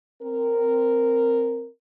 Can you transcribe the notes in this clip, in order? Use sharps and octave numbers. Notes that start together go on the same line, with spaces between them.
C4 A#4